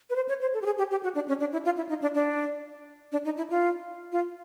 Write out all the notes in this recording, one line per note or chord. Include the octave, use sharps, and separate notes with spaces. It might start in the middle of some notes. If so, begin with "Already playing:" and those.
B4
C5
C#5
C5
A4
G4
G#4
G4
G4
F#4
D4
C#4
D4
E4
F4
E4
D#4
D4
D4
D4
D#4
E4
F4
F4